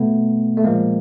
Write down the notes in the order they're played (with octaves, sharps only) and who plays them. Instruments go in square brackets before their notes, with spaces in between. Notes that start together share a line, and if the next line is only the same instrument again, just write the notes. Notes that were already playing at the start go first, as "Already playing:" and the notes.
Already playing: [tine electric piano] B2 A3 B3
A3
A#2 F3 G#3 A#3